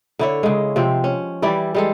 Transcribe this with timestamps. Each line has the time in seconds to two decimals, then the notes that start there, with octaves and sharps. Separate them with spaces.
0.19 D3 E4 C#5
0.43 C#3 G#3
0.76 C3 F3 C4
1.04 C#4
1.42 E3 G3 E4 D5
1.75 G3 G#3 A4